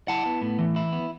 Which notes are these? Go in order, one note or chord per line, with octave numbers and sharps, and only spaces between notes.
E4 F#5 A5
B3
A2
E3
E4
B3